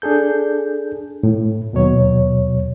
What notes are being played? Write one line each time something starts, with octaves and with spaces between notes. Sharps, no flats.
D4 G#4 A4 G6
A2
D#2 B2 F#3 C#5